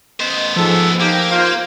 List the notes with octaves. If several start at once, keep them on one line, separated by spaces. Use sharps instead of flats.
B3 C5 D#5
G#2 F3 A4
A#3 D#4 G4
F4 C5 F5